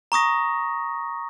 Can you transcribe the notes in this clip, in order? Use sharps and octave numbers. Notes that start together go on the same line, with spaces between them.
A#5 C#6 D#6 A#6